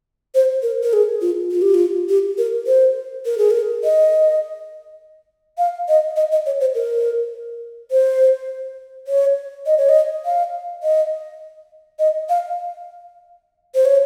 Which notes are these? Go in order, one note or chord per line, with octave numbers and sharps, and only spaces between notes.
C5
A#4
A#4
G#4
F4
F4
G4
F4
G4
A#4
C5
A#4
G#4
A#4
D#5
F5
D#5
D#5
D#5
C#5
C5
A#4
C5
C#5
D#5
C#5
D#5
F5
D#5
D#5
F5
C5
C#5